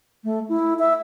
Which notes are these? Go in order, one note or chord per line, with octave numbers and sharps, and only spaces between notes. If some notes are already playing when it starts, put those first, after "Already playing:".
A3
E4
E5